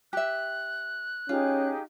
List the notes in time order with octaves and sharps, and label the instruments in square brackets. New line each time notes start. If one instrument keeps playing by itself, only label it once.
[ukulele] G4 E5 [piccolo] F#6
[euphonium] C#4 [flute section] D#4 G4 G#4 [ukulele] F4